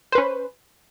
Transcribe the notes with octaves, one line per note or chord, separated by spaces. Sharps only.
C#4 B4 C5